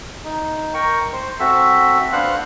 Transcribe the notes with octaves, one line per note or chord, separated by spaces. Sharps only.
D#4
A#4 G5 C#6
C5
C4 F#4 A4 E5
B3 D4 C5 F5 F#5 F#6